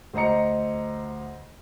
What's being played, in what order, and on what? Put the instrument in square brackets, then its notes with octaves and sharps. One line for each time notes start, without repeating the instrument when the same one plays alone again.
[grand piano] D2 C5 D#5 A#5 C#7